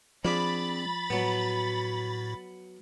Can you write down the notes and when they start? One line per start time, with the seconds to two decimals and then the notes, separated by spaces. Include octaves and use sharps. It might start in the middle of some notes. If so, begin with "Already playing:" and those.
0.25 F3 C4 D4 G#4 B5 D6 A6
1.10 A2 F#3 B3 F#4